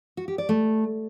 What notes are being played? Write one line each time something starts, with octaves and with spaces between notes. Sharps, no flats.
F#4
G4
D5
A3